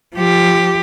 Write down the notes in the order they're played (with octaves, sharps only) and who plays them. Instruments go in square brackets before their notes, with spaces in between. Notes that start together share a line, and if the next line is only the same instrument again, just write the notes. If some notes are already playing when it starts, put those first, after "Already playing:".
[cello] F3 G4